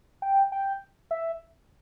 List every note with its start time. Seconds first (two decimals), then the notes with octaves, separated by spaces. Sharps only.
0.22 G5
0.52 G5
1.11 E5